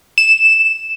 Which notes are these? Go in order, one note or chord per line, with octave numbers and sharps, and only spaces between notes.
E7